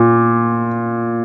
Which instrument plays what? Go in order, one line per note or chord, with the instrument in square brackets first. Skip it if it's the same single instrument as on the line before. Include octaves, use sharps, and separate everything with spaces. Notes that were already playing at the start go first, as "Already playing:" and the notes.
Already playing: [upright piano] A#2